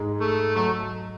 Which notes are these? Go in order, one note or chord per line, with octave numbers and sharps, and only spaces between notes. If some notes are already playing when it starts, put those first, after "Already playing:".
Already playing: G#2 G#3
A3
F#3 A3